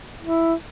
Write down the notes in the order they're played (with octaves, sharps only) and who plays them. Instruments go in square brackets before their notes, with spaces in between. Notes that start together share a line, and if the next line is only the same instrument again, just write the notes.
[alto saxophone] E4